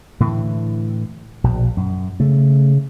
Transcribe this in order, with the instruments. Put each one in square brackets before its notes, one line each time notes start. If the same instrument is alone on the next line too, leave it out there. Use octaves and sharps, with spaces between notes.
[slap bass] A2 D3 E3
A#1 B2
F#2
[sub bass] C#3 [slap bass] A3